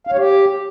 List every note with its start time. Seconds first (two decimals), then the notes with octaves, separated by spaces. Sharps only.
0.07 F5
0.12 C#5
0.17 G4